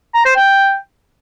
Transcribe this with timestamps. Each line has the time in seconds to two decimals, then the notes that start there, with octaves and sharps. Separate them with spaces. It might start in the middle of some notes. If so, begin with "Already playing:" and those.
0.14 A#5
0.25 C5
0.36 G5